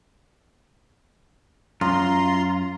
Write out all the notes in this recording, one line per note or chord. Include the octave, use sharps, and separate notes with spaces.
F#2 F4 A#5 C6